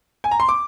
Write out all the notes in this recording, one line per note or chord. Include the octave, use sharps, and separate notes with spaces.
G#5
A#5
C6
D6